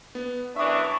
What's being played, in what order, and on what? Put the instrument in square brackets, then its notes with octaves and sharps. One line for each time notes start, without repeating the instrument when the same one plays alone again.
[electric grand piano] B3
[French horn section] F#2 E3 D4 [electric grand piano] E5 D#6 [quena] C#6